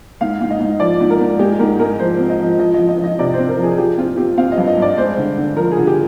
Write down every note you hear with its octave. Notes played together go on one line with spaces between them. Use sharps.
G#2 F5
G#2
D#5
G#2
F3 D5
G#2
A#4
G#2
G#3 G4
G#2 A#4
G#3 A#4
F3 C5
C4
D#5
F3
F3 D#5
F3 D#5
D#5
F3
D#5
C3 D5
C4 C5
A#4
F3
G#4
F3 G4
C4 F4
C4 G4
C4 F5
D#5
G2
D#5
G2 D5
G#3 C5
D3
D3
F3 A#4
G#4
D3
G4